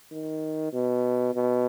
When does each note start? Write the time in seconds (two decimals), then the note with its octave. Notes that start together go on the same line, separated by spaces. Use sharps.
0.12 D#3
0.73 B2
1.34 B2